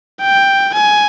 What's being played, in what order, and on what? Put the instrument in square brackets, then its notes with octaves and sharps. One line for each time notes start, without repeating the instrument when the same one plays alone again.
[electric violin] G5
G#5